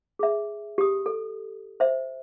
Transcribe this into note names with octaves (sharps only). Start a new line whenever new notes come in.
G#4 E5
G4 D#6
A4
C5 E5